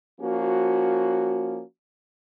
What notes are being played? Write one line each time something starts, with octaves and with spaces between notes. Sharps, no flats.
F3 A#3 C#4 F#4